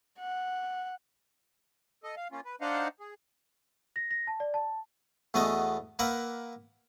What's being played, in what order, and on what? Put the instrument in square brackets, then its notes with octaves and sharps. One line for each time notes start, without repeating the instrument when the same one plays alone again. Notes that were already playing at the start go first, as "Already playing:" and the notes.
[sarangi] F#5
[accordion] A4 D#5
F5
A#3 C#4 F4
B4
D4 D#4 C5 D#5 F5 F#5
G#4
[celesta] A#6
A#6
A5
D5
A5
[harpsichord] E2 B2 A3 B3 D#5 G#5
A#3 A#4 B4 E5 F#5